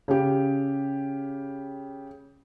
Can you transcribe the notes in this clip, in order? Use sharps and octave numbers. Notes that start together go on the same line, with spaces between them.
C#3 G4